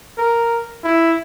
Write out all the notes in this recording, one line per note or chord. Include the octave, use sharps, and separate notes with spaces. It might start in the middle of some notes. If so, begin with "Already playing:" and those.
A#4
E4